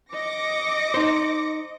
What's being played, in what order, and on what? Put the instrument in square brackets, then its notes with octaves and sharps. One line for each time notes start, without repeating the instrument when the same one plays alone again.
[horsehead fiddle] D#5 [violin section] D6 A#6 C#7
[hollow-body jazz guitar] D#4 C5